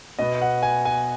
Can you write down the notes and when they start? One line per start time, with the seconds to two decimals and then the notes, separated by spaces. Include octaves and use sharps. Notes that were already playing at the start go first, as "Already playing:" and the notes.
0.19 B2 B3 D#5
0.41 F#5
0.63 G#5
0.85 G#5